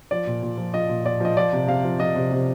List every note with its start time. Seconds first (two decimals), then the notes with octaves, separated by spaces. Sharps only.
0.11 F3 D5
0.27 A#2
0.43 A#2
0.58 F3
0.74 F3 D#5
0.89 A#2
1.05 A#2 D5
1.20 F3 D#5
1.37 F3 D5
1.53 C3
1.67 C3 F5
1.84 F3
2.00 F3 D#5
2.15 C3
2.31 C3